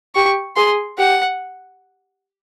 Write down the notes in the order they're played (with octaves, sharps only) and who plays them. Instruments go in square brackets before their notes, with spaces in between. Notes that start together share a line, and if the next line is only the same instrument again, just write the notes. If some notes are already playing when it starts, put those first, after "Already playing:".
[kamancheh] G4 [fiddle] C#6
[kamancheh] G#4 [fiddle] C6
[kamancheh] G4 [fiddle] F#5